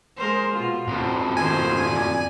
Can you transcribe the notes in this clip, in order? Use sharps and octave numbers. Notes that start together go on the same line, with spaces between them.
G#3 A#4 C5
B2 F4
F2 B2 C5
D#3 C5 G#5
D5